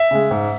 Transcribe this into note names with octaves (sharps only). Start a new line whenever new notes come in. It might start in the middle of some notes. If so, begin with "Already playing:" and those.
Already playing: E5
C#3 G#3
G#2